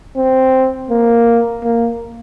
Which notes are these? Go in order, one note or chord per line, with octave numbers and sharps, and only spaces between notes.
C4
A#3
A#3